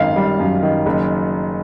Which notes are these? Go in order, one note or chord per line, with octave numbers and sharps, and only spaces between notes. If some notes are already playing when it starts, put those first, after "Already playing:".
Already playing: G#1 F#2 D#3 F5
G3
F#2
D#3
F#1